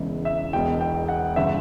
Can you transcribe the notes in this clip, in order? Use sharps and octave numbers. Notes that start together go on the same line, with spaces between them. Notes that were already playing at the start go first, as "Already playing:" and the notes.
Already playing: E1 E2 C#3 E3
E5
E1 E2 B2 G5
G5
F#5
G1 C#3 E3 E5